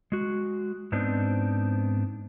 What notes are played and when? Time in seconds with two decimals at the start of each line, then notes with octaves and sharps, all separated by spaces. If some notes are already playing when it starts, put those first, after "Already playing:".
0.12 G#3 F#4
0.92 G#2 B3 C4 D4 D#4